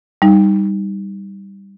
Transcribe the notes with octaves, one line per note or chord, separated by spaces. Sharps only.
G3 D#4